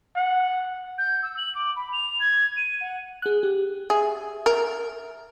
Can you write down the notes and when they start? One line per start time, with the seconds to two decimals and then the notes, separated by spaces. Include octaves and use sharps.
0.16 F#5
0.98 G6
1.23 E6
1.37 F#7
1.55 D6
1.76 B5
1.93 F7
2.20 G#6
2.57 D#7
2.81 F#5
3.22 G#4 F#6
3.43 G4
3.90 G#4 E5
4.46 A#4